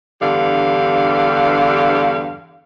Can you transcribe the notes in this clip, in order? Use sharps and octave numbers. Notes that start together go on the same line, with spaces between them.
E2 G2 D3 G4 F5